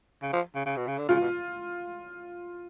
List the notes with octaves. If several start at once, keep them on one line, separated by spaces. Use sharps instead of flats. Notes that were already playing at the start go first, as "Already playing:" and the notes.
C#3
F3
C#3
C#3
B2
C#3
D3
C#3 F4
B2